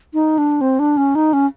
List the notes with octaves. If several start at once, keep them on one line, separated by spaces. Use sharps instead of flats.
D#4
D4
C4
D4
C#4
D#4
C#4